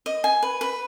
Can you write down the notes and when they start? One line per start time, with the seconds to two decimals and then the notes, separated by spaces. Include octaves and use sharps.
0.06 D#5
0.24 G#5
0.43 B4
0.61 B4